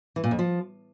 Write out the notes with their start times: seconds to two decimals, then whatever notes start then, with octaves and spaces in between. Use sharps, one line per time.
0.16 E3
0.24 A#2
0.31 F2
0.39 F3